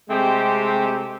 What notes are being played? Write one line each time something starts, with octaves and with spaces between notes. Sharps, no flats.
C3 G#3 A3 C4 G4